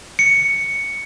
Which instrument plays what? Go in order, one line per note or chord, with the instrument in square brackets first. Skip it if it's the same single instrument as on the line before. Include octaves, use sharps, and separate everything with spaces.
[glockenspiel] C#7